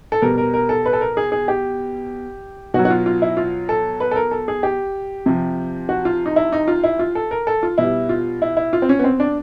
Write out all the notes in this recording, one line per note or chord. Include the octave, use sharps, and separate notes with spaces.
A4
B2 G3 A#4
A#4
A#4
A4
B4
A4
A#4
G#4
G#4
G4
B2 F#3 F#4
F#4
F4
F4
E4
F4
A4
B4
A4
A#4
A4
G#4
G4
C3 F3
F#4
F4
D#4
E4
D#4
F4
E4
F4
A4
A#4
A4
F4
B2 G3 E4
F4
E4
E4
F4
C4
C#4
B3
C4
D4